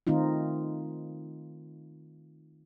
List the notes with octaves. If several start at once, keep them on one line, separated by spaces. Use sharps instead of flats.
D#3 A3 C4 D#4 F4